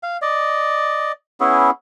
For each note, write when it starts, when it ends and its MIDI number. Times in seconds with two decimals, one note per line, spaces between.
0.03 0.17 77
0.22 1.12 74
0.22 1.12 75
1.40 1.70 59
1.40 1.70 61
1.40 1.70 64
1.40 1.70 68